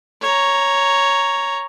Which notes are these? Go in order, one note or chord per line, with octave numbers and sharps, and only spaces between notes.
C#5 A#5